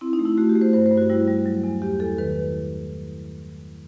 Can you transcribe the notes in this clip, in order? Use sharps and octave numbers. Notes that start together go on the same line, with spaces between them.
C4 E4
D#4
A3
E4
A3 F#4
G4
A3
C5
G2 C5
C5
G2
F#4
G3 E4
G3
F#3
E2
E2 G4
E2 A4
D#3 B4